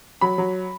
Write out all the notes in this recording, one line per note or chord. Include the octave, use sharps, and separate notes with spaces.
F#3 B5
F#3